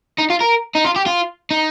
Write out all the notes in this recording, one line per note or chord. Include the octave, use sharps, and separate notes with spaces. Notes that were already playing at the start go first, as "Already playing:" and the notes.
D#4
F4
A#4
D#4
F4
G4
F4
D#4